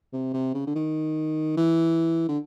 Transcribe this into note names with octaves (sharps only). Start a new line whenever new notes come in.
C3
C3
C#3
D3
D#3
E3
D3